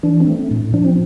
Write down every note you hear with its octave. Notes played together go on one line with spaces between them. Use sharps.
E3 D4
C4
A3
A2
F3 D4
C4